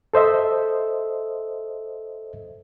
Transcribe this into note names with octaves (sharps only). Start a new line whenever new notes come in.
A4 C5 D#5 E5